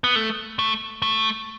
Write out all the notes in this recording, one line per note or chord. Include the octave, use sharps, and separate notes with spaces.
B3
A3
A3
A3